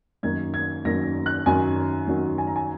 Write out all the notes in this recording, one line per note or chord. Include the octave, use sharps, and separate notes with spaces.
F#2 D#3 A#3 G#6
G#6
F#2 D#3 A#3 A#6
F#6
F#2 D#3 F#3 G#5
F#2 D#3 F#3
G#5
A#5
G#5